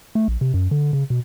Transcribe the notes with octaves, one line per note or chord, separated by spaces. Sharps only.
A3
A#1
C3
F#2
D3
C#3
B2